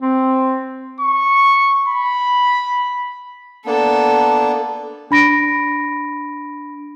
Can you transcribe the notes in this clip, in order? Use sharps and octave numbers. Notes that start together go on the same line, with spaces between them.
C4
C#6
B5
A#3 B3 D4 A4
D4 B5 A#6 D7